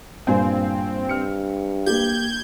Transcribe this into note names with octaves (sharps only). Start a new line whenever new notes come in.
G2 A#2 C4 G#5
G2 F6 C#7
A#3 G4 G6 G#6